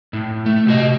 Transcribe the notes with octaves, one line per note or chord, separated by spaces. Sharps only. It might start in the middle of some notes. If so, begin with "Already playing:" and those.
A2
A3
C3 F#4 D#5